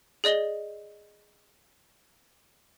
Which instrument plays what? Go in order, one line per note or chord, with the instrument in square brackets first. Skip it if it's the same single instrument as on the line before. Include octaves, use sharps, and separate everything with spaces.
[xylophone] G#4 D5 D#5 F#7 G7